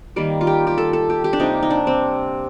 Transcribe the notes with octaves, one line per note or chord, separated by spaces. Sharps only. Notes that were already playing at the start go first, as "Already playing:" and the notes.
D#3 G3 A#3
F4
G4
G4
A4
A4
G4
G4
D4
C3 G3 A#3 D#4
D#4
D4
C4